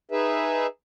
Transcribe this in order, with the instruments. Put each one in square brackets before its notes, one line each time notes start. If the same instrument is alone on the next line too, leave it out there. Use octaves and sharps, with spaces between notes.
[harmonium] D#4 G#4 B4 E5